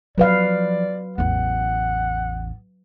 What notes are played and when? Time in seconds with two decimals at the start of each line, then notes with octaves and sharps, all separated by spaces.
0.18 F3 F#3 B4 D5 F5
1.18 A1 E2 F#5